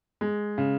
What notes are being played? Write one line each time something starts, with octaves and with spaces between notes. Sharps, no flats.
G#3
C#3